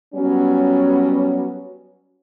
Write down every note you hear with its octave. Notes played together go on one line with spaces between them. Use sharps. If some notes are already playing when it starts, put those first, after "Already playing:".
F#3 G3 B3 C#4